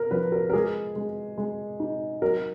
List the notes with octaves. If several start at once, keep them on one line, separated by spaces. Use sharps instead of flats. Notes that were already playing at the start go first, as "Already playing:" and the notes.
Already playing: B3 A#4
F3 B4
A#4
A#4
G#3 G#4
G#3
G#3
D#4
F#3 A#4